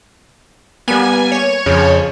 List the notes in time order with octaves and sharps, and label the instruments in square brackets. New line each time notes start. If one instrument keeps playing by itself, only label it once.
[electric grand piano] G3 A#3 [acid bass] B3 [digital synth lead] G#5
[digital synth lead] C#5
[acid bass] F2 [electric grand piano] C#3 F3